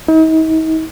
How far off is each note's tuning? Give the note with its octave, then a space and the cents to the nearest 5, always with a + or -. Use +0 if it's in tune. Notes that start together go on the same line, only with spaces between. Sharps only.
D#4 +40